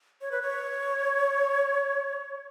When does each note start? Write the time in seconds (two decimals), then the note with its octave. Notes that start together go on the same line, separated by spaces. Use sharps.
0.21 C#5
0.32 B4
0.42 C#5